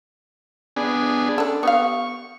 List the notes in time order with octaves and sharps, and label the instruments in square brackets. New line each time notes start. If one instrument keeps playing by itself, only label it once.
[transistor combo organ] B3 D4 G#4
[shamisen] C#4 D4 A4
[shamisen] B3 G4 F5 [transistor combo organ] C#6